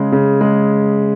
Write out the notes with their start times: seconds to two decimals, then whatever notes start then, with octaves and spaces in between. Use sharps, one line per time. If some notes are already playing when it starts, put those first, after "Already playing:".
Already playing: C#3 G#3
0.12 C#3
0.41 G#3